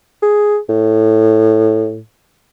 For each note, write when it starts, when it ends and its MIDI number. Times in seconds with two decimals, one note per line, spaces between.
0.23 0.58 68
0.69 1.99 45